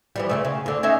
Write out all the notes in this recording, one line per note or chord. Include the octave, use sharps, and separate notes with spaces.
E3 F3 G3
D2 C#3 A3
C#3
D2 D3
C#4 D#4 E5